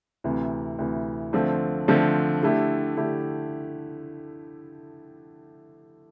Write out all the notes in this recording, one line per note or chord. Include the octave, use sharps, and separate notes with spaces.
D2 C3 E3
D2 C3 E3
D3 F3 A3 C4
D3 F3 A3 C4
D3 A3 E4 G4
D3 A3 E4 G4